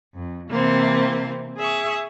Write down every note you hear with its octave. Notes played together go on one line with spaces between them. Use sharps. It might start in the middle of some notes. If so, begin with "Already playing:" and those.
F2
C3 E3 A#3 C4 C5
G#4 E5 C#6 D#6